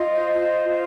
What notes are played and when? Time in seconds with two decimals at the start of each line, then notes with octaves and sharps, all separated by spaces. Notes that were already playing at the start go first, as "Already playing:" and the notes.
Already playing: F4 D#5
0.10 C5
0.38 F4
0.67 F4